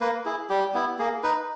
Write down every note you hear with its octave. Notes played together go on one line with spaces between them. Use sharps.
A#3 B4
E4 G#4
G3 G4
B3 E4
A#3 G#4
D#4 B4